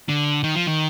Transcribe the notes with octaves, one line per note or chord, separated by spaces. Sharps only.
D3
D#3
F3
D#3